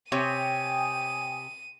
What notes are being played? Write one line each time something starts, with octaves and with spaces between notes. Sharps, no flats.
C3 G4 C#5 G5 G#5 D#6 D#7